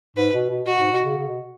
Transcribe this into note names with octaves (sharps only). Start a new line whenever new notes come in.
G#2 B4
B2
B2
B2 F#4
G#2
B2
C#3
C#3
B2